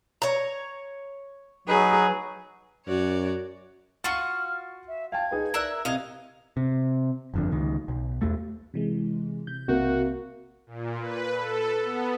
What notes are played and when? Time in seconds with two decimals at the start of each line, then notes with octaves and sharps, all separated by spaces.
0.22 C#5 A#5
1.68 F#3 D#4 G#4 B4
2.88 F#2 F#4 C#5 D5
4.04 F4 F#4 C#6 F6 A6 C7 C#7
4.88 E5
5.12 F5 G5 A5 G#6
5.31 D#4 G#4 B4
5.54 A#4 D5 E5 A#5 F#6
5.85 C3 D#5 F5 G#6
6.57 C3
7.34 G1 F2 D3
7.52 C#2 D#3
7.88 B1
8.22 E2 A3
8.74 C3 E3 G#3
9.47 C3 G6
9.68 B1 C3 A#3 F#4
10.66 A#2
10.99 B4
11.35 A4
11.82 B3